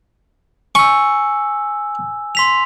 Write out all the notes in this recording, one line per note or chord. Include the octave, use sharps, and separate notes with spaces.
G#5 C#6 E6
C6 B6 F7